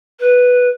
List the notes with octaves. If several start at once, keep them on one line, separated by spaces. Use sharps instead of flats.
B4